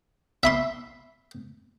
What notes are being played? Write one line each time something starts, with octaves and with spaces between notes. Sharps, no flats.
E5 B5 C6